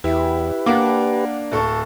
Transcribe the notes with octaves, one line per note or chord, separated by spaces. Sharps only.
E2 E4 G4 B4
A#3 D4 F#5 D6
D1 A4 C#6